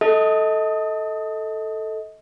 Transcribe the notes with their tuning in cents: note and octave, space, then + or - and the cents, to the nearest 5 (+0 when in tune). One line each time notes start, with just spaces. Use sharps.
A4 +0 D#5 +30